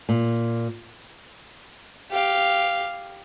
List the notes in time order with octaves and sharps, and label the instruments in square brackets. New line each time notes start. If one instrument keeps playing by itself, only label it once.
[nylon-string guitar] A#2
[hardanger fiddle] G4 F5